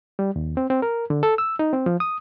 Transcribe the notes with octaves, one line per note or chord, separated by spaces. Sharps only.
G3
D#2
C4
C4
A#4
D3
A4
E6
D#4
C4
F3
D#6